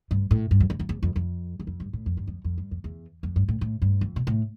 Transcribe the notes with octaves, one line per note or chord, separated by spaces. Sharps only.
G2
A2
G2
F2
E2
F2
E2
F2
F2
E2
F2
G2
A2
F2
G2
F2
F2
G2
F2
E2
F2
G2
A2
A2
G2
F2
B2
A2